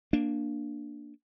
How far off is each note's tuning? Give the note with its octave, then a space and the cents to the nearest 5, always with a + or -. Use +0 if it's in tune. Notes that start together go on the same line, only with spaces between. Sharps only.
A#3 +0 D4 +0